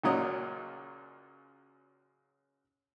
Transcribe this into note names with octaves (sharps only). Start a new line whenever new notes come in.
C#2 F#2 A#2 F#3 D#5